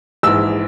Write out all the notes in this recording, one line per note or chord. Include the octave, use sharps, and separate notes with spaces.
A#1 G#2 E3 E6